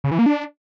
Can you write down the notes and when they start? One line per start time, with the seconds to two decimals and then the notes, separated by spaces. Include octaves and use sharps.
0.04 C#3
0.11 E3
0.19 A#3
0.26 D4